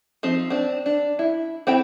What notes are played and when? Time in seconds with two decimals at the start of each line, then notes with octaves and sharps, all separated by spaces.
0.23 F3 C4 D#4
0.50 C4 D4
0.86 D4
1.19 E4
1.67 C4 E4 G5